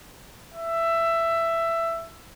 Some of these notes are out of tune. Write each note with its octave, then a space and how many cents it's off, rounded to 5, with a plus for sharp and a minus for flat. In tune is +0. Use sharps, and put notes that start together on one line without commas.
E5 +15